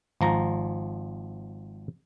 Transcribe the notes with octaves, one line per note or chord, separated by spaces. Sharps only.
G#1 F3 A#5